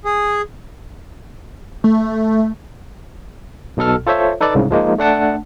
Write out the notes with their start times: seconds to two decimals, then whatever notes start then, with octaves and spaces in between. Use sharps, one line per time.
0.05 G#4
1.84 A3
3.77 B1 B2 A4 F6
4.07 F4 A4 C5 C#5 E5
4.41 D#4 A4 B4 D5
4.55 C2 G#2 C#3
4.70 F3 G#3 A#3 D#4
4.98 A3 D4 F#5 A5